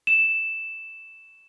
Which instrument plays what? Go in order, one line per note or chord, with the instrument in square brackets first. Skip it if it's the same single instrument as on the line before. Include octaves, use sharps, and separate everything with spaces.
[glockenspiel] E7